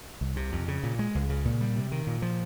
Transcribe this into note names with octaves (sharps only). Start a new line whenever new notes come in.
C2
C3
F2
C#3
A#2
G#3
C#2
C#3
A#2
G3
C3
D#3
A#2
F3